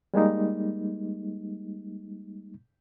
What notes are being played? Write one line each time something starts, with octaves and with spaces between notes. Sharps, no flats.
G3 G#3 A#3 D#4